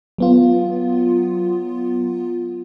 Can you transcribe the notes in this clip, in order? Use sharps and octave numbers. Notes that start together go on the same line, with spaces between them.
F#3 B3 F4